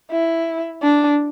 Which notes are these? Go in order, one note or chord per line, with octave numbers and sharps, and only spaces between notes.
E4
D4